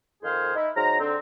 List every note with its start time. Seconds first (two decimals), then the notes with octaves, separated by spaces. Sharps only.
0.22 F2 D#3 G#4 C5 F5
0.55 D#4 E4
0.75 G#2 F#3 A#5
1.00 D3 C4